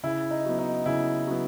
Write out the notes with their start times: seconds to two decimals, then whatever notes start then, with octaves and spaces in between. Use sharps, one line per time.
0.03 C#3 E4
0.31 D#4
0.45 F#3 B3
0.59 D#4
0.86 C#3 E4
1.27 F#3 B3